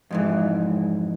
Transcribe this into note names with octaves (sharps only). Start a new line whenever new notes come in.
F2 G#2 E3